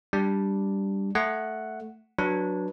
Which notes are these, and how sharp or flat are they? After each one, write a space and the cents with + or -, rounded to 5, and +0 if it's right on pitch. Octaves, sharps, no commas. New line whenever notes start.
G3 +0 D4 +0
A3 +0 F#5 +0
F#3 +0 D4 +0 B4 -25